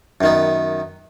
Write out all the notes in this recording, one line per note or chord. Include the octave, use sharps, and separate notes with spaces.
F#2 D#3 B3